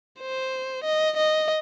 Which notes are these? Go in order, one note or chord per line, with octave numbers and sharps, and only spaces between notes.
C5
D#5
D#5